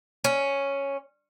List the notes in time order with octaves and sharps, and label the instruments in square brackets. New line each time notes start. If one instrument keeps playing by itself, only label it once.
[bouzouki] C#4